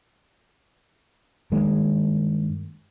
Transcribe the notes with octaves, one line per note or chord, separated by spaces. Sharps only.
G2 D#3 G#3 A#3